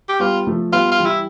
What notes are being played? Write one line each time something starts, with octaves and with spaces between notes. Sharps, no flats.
G4
G3 B3 F4
F3 A3
G3 B3 F4
F4
E3 G3
E4